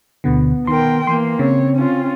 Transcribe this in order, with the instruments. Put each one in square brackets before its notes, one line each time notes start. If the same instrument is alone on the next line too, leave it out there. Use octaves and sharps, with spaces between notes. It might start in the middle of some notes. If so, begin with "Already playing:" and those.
[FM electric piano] D2 B2 D3 [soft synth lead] B3
[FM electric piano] D#3 C6 [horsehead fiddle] A#4 G5
[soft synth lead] E3 [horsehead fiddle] A#3 [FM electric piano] C6
[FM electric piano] C#3 [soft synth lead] C4 [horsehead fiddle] C#5
[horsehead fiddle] C#4 F4